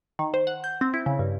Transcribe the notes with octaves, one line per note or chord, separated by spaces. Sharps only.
D#3
C5
F#5
G6
C4
E4
C#3
G2